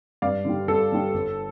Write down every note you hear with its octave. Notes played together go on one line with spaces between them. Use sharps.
G2 D5 F5
D3 G3
G2 A4
D3 G3
G1